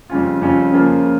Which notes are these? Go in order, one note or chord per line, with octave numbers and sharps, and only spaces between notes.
F2 C#3 G3 C#4 F4
F2 C#3 G3 C#4 F4
C#3 F3 A#3 C#4 F4
C#3